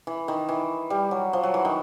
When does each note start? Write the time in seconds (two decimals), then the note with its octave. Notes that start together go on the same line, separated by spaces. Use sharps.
0.07 E3
0.28 D#3
0.49 E3
0.90 G3
1.11 F#3
1.33 F3
1.43 F#3
1.54 E3
1.65 D#3